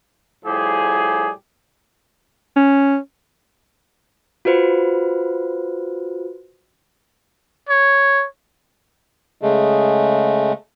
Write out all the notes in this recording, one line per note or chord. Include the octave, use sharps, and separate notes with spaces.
A2 F3 G3 G4 G#4
C#4
F4 F#4 B4 C5
C#5
C#3 G#3 A3